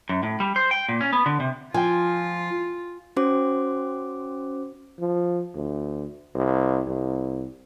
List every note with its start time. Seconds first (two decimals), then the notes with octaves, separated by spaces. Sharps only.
0.09 F#2
0.23 A2
0.40 G3
0.56 C5
0.71 G5
0.89 A#2
1.01 C#4
1.13 B3
1.26 D3
1.40 C3
1.74 F3 F4 G5 G#5
3.17 C#4 F#4 C5 D6
5.00 F3
5.55 D2
6.35 C2
6.87 C2